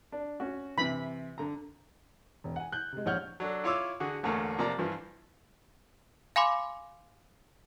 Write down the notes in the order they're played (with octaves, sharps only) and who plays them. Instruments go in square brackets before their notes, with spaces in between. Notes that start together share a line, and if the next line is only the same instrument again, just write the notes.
[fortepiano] D4
C#4 F#4
[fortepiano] C3 E3 [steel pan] B5
[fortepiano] D3 A#5
[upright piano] E1
F#5 G#5
F#6 G6
C3 G#3
A#1 C#5 F#5 F6 G6
[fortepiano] F#3 D4 A4
E4 F4 C#5 C6 D6 E6
D3 F#4 G#4
A1 E2 D3 A3 A#3
C3 F3 A#3 D5 A#5
G2 E3 F3
[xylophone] F5 G#5 B5 C6 D6